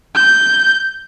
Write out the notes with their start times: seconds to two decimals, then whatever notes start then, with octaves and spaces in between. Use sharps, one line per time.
0.15 G6